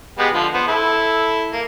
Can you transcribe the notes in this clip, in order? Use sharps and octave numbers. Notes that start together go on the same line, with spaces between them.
G#3 B3 G4
D3 F3 C6
B3 C5
E4 A4
A#3